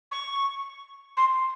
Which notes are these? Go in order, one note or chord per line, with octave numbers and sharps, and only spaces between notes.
C#6
C6